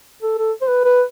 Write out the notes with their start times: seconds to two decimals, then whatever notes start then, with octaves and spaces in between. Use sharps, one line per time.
0.23 A4
0.38 A4
0.62 C5
0.69 B4
0.85 B4